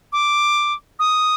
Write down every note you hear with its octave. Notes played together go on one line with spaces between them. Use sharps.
D6
D#6